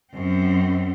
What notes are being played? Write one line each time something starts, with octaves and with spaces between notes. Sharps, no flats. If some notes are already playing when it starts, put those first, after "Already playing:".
F#2 C4